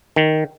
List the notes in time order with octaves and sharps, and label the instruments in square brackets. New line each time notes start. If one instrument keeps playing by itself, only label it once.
[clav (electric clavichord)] D#3